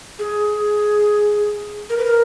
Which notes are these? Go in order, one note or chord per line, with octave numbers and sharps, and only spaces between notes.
G#4
A#4
B4
A#4